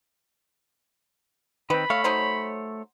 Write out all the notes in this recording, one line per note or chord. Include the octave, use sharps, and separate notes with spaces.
D#3 C4 B4 B5
A3 C#5 F5
F#3 D#4 C5